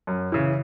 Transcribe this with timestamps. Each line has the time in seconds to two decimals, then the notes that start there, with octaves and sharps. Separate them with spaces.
0.07 F#2
0.32 C#3 E3